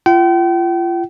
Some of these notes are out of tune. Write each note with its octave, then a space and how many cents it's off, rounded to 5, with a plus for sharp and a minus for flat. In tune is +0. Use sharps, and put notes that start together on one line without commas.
F4 -30 G5 -40